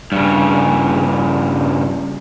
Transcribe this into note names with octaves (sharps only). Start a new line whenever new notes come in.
G2 C#3